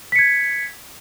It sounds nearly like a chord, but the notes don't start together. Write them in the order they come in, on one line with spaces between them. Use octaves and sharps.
B6 C#7 G#6